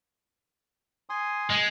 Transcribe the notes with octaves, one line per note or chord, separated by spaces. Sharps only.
G#5 C6 D#6
G#3